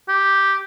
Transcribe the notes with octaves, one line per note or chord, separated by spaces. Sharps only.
G4